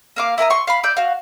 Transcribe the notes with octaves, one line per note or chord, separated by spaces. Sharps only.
A#3 F5 D6
E4 A#4 A#5 D#6
C6 C#6
F5 B5
D5 E6 G6
F#4 F5